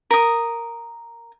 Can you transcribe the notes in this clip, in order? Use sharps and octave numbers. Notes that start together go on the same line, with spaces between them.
A#4 D#6